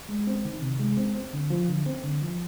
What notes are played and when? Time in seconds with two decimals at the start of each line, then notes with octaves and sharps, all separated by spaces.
0.09 G#3
0.27 C4
0.45 D#3
0.62 C3
0.79 G#3
0.97 C4
1.15 C4
1.33 D3
1.50 F3
1.68 D3
1.86 C4
2.03 D3
2.22 F3